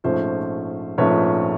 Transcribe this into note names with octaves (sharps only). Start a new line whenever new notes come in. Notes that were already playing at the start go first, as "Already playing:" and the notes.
A#1 G#2 F3 A3 C#4 C5
A#1 G#2 F3 A3 C#4 B4 C#5